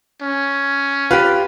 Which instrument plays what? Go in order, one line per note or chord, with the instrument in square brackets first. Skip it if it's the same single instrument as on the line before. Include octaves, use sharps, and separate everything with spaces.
[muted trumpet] C#4
[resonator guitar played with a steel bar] F4 G4 [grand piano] B4